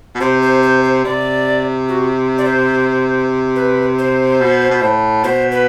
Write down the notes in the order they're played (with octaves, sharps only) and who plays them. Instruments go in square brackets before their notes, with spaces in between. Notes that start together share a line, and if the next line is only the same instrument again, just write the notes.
[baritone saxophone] B2
[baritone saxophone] C3 [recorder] C5
[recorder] C5
C5
C5
[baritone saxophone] C3 [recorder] D5
[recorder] F#4
D5
C5
B4
C5
[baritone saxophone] B2
B2
A2
[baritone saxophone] B2 [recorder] C5
[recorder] B4